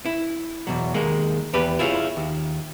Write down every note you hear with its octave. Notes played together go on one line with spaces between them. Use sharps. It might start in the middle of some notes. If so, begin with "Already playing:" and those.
E4
E2 B2 F#3
D#2 D#3 G#3 A#3
E2 G4 B4
E4 F4 G#4 A#4 C#5
D#2